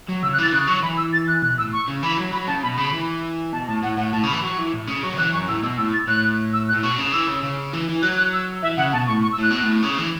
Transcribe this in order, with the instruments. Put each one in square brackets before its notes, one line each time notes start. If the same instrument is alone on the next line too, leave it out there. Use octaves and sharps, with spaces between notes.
[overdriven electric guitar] F#3
[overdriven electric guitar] C#3 [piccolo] E6
[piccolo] F#6
[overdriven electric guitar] E3 [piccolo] A6
[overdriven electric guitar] C#3 [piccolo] F#6
[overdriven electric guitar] F#3 [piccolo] C#6
[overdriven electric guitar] E3 [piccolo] B5
[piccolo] E6
A6
F#6
[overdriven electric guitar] B2 [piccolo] F#6
[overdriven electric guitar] A2 [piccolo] E6
[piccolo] C#6
[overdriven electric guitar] C#3
[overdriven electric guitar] E3 [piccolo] B5
[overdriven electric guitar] F#3
[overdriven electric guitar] F#3 [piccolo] B5
[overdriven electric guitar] C#3 [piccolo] A5
[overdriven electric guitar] B2 [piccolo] B5
[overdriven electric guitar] C#3 [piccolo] B5
[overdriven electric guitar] E3
[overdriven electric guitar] B2 [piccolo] A5
[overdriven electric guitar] A2 [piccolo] A5
[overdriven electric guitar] A2 [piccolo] F#5
[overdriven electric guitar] A2 [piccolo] F#5
[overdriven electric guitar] A2 [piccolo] A5
[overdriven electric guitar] C#3 [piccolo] B5
[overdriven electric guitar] E3
[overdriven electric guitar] F#3 [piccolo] C#6
[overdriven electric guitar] E3
A2
C#3
[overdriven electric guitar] F#3 [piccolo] C#6
[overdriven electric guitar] C#3
[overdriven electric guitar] E3 [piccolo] F#6
[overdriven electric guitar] F#2 [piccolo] C#6
[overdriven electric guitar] A2 [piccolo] E6
[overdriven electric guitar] B2 [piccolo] E6
[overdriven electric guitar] A2 [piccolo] E6
[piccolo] A6
[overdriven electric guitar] A2 [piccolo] F#6
[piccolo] E6
F#6
[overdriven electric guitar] A2
[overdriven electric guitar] B2 [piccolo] C#6
[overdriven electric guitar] C#3
[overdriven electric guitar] E3 [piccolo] E6
[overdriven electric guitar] C#3
C#3
E3
E3
[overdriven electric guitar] F#3 [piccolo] F#6
[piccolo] F#6
E6
[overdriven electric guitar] E3 [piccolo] E5
[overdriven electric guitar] C#3 [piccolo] F#5
[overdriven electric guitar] B2 [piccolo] A5
[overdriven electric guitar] A2 [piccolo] C#6
[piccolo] C#6
E6
[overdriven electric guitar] A2 [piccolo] F#6
[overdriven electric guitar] B2
A2
C#3
E3